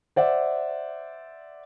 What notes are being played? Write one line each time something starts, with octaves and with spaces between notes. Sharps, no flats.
C5 D5 E5 F#5